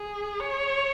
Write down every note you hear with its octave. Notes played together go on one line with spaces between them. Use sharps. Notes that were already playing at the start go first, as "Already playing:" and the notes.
Already playing: G#4
C#5